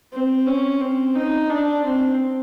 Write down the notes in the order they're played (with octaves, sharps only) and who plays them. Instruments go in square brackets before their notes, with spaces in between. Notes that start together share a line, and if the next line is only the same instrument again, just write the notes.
[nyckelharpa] C4
C#4
C4
D#4
D4
C4